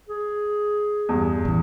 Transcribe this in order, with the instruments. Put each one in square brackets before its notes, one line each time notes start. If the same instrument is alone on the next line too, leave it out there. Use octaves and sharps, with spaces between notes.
[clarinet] G#4
[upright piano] E2 G2
[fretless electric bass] A1 E3